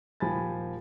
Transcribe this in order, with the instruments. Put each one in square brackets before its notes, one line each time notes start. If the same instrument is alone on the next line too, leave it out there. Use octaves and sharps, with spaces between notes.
[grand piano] D#1 F3 G4 G#5 B5 A6